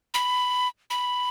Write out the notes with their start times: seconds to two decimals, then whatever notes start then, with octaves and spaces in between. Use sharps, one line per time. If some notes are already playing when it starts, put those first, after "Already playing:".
0.14 B5
0.90 B5